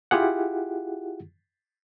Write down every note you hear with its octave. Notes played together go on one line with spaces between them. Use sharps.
E4 F4 G4 G#4 F#5